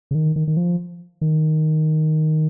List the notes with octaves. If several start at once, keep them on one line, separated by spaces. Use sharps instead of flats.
C#3
D#3
D#3
D#3
F3
D#3